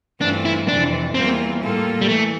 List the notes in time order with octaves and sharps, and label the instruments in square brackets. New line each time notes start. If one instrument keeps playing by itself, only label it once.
[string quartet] G2 E3 A3 C4 F4 [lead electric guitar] D4
[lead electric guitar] E4
[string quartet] F2 C3 E3 [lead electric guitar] D4
[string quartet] E2 E3 G3 A#3 F4 [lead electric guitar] C4
[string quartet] A2 G3 A#3 F4 A4
[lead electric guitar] G3
[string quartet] E3 [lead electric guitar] A3